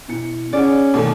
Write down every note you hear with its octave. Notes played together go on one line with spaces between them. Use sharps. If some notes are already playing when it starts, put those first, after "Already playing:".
B2 E4 C#7
C#4 D#4 G#4 D5 F#5
B2 D#3 A3 D6